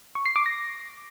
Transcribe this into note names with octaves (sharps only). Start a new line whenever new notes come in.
C#6
C7
D6
A#6